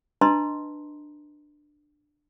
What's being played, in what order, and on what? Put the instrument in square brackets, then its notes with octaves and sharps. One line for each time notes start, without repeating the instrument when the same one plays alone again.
[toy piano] D4 B4 D#5 A5 A#5 C6